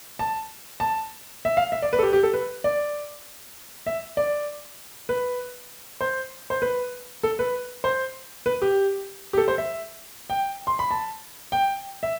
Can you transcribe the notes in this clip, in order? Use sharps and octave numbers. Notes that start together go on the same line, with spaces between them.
A5
A5
E5
F5
E5
D5
B4
A4
G4
G4
A4
B4
D5
E5
D5
B4
C5
C5
B4
A4
B4
C5
B4
G4
G4
A4
C5
E5
G5
C6
B5
A5
G5
E5